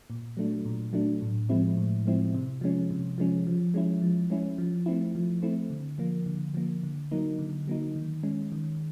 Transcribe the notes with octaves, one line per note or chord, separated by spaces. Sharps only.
A#2
F#3 A3 D4
A#2
F#3 A3 D4
A2
F3 G#3 C4 E4
A2
F3 G#3 C4 E4
C3
F3 G#3 C#4
C3
F3 G#3 C#4
F3
G#3 C#4 E4
F3
G#3 C#4 E4
F3
A3 C4 E4
F3
A3 C4 E4
D3
F3 A#3
D3
F3 A#3
D3
F#3 A#3 D#4
D3
F#3 A#3 D#4
D#3
G#3 C#4
D#3